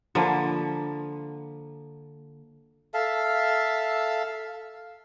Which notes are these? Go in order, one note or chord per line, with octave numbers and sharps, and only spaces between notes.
D3 F3 A#3 B4
A4 E5 F5